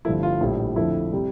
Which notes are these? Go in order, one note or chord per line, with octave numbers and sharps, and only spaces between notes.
G1 G2 F3 A3 E4
F4
A#1 A2 G3 E4
F2 D3 F3 A3 E4
C3 G3